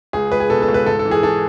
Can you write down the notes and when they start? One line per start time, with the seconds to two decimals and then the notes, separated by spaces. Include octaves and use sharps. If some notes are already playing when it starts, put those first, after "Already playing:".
0.13 C#2 G#4
0.32 C#2 B4
0.40 G#4
0.50 B2 A4
0.62 A4
0.69 C#2
0.74 B4
0.86 G#2 A4
0.99 A4
1.05 E3
1.11 G#4
1.23 E3 A4